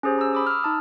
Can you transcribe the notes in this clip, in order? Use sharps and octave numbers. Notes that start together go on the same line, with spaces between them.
C#4 G4 G#4 C5
A#5 E6
B5 D6 D#6
E6 F6
D#4 A5 D#6